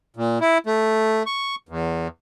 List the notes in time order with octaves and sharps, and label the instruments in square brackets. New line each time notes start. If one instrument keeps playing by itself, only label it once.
[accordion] A#2
E4
A3
C#6
E2